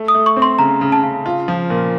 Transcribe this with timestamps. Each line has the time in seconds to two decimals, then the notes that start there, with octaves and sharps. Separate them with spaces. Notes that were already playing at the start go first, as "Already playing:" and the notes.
Already playing: A3
0.08 D#6
0.15 A3
0.26 C#6
0.37 C4
0.42 C6
0.59 C#3 A#5
0.81 C#3
0.92 A5
1.03 C#3
1.26 F4
1.48 F3
1.70 A#2